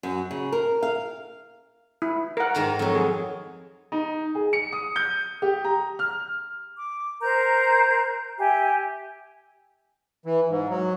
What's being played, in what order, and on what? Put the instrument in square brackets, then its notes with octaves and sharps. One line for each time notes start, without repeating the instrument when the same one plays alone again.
[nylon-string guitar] F#2
C#3
A#4
F5
[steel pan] E4
A#4 F#5
[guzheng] G#2 D#3 A#5
F2 F#3
[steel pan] G#4
[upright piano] D#4
G#4
C#7
D#6
G6
G4
A#5
F6
[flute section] D6
A#4 C5 A#5 G6
G4 E5 G#5
[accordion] E3
G#2
F#3